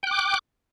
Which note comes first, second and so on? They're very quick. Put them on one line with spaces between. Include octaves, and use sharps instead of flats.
G5 F#6 D6